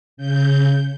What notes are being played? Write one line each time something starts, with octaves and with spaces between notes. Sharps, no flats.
C#3 G6